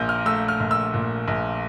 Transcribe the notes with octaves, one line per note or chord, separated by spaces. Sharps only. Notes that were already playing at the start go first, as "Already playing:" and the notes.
Already playing: A#1 A#2 G6
F6
A3 E6
F6
A#1
E6
A#2
A#1